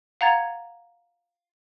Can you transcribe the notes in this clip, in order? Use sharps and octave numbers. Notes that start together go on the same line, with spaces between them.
F5 F#5 A#5 G#6 A6